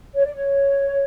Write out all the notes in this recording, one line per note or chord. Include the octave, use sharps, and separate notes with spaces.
C#5
D5
C#5